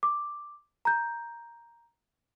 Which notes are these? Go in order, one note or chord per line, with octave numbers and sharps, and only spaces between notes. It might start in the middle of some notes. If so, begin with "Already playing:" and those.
D6
A#5 G6